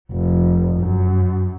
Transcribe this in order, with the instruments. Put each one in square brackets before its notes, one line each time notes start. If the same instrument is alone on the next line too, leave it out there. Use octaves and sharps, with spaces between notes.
[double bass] F1
F#2